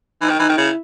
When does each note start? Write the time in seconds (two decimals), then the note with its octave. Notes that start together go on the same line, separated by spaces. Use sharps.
0.21 E3 D#4
0.30 D#3
0.39 E3 D#4
0.49 D#3
0.57 C#3 E4